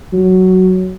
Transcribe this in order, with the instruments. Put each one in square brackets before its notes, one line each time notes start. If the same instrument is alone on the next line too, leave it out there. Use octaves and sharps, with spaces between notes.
[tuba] F#3